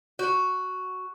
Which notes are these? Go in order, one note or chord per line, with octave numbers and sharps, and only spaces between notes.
F#4